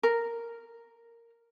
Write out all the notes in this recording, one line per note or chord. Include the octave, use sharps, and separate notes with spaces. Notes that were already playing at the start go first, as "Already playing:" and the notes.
A#4